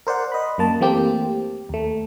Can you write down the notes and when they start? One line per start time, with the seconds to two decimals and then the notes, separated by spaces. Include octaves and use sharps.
0.07 A#4 C5 D5 F#5
0.32 D#5 B5
0.58 F#2 A#3 A5
0.80 E3 A3 A#3 C4 G4
1.69 D#2 A3